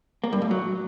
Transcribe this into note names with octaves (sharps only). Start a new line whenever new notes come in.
A#3
G2
A2
F#3